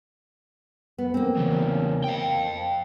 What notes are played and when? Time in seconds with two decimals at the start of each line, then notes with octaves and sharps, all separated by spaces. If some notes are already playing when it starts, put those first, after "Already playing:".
0.98 B3
1.14 A#3 C4
1.36 E2 C#3
2.04 F5 G5